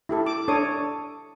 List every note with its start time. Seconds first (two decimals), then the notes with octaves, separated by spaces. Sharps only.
0.09 E4 G4 A4
0.26 D6
0.48 D4 A4 C#5 D#6